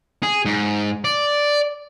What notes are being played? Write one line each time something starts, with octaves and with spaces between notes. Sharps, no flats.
G#4
G#2
D5